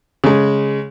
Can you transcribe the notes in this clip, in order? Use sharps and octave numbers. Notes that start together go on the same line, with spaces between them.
C#3 G#3